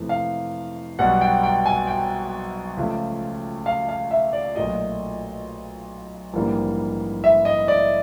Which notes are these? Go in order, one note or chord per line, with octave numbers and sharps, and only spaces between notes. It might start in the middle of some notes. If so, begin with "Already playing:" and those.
Already playing: F2 C3 E3 A3
F5
B1 B2 G3 F#5
G5
G5
G#5
G5
C#2 C#3 F3 A3
F5
F5
E5
D5
B1 A#2 F#3 A3 D#5
A#1 G#2 E3 G3 A#3
E5
D#5
D5